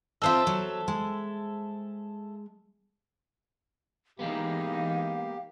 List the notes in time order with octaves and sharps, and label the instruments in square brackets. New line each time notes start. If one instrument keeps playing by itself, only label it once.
[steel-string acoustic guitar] C4 F4 D#5 [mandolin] A4 C5 E5
[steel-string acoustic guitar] F#3
G#3
[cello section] E3 D#4 [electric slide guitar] G#3 A#3 B3 [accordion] G4 [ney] F5